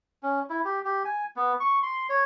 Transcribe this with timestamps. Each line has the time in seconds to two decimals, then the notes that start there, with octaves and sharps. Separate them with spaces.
0.23 C#4
0.50 E4
0.65 G4
0.85 G4
1.05 G#5
1.36 B3
1.60 C#6
1.83 C6
2.09 C#5